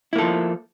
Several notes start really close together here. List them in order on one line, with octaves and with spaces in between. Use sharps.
E4 A#3 A4 F3